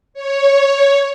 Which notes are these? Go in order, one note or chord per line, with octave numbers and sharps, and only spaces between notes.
C#5